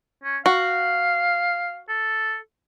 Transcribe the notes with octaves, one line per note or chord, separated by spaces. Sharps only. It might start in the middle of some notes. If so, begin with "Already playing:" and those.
C#4
F#4 F5
A4